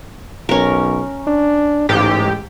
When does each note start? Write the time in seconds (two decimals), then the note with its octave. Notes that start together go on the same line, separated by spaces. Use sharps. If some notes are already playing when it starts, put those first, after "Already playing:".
0.49 B1 C#4 A#4
1.27 D4
1.89 A1 G#2 G4